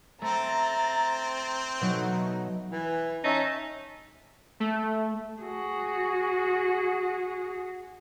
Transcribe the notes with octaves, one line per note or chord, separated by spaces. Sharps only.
A3 C4 A#5 A6
B2 F#3 A3 D#4 F#4
E3
C#4 D#4 E5 A5
A3
F#4 G#4